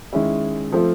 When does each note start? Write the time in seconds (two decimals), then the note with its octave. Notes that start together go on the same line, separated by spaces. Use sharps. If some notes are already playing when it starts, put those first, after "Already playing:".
0.13 D#3 G#3 C#4 E4
0.72 F3 A3 C4 F4